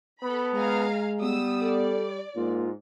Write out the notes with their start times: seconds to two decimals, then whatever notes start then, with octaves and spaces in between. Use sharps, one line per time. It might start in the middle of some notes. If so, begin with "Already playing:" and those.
0.23 B3 A4 B5
0.54 G#3 F5 G#5 A#5
1.21 G3 B3 D#6 E6
1.62 A4 D5
2.36 G#2 A#3 F4